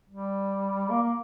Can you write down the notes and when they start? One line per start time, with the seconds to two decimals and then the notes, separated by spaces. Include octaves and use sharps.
0.10 G3
0.89 A#3
1.02 A#3